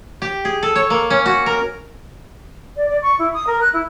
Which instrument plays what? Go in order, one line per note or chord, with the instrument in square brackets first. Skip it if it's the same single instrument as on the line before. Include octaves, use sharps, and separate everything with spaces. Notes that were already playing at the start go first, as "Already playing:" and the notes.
[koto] G4
G#4
A4
C#5
A#3
C#4
F#4
A#4
[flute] D5
D5
C#6
E4
D#6
A#4
F#6
E4